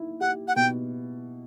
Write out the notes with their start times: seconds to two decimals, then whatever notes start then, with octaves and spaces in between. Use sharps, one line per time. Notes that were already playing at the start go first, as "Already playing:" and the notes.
Already playing: A#3 E4
0.21 G4 F#5
0.48 F#5
0.56 B2 G5